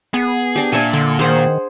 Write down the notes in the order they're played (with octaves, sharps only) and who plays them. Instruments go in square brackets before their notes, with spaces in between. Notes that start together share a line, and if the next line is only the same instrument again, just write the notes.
[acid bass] B3 [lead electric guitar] G#4
[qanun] D4 G4
[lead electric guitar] A#2 [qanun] D4 E5 G#5
[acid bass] D3
[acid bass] D#3 [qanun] G#4 C5 F#5